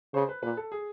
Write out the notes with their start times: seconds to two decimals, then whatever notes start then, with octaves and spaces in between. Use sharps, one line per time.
0.14 C#3 C5
0.29 B4
0.43 A#2 B4
0.57 A4
0.72 G#4